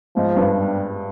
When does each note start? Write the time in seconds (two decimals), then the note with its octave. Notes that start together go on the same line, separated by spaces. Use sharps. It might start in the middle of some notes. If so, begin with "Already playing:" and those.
0.16 G#2 F3
0.36 G2
0.57 G3